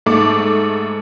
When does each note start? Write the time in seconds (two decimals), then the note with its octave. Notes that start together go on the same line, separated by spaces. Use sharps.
0.06 G#2 A3 D6